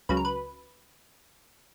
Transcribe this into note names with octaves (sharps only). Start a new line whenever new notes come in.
C#2 C#3 F#3 B4
A#4
B4